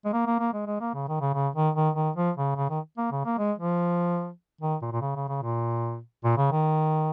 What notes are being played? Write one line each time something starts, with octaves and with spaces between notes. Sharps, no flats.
G#3
A#3
A#3
A#3
G#3
G#3
A#3
C#3
D#3
C#3
C#3
D#3
D#3
D#3
F3
C#3
C#3
D#3
A#3
C#3
A#3
G#3
F3
D#3
A#2
A#2
C#3
C#3
C#3
A#2
A#2
C#3
D#3